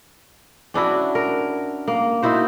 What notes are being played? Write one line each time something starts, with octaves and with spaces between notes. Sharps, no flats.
C#4 D4 E4 F#4
A#4
A#3
D#4 E4 F#4 C5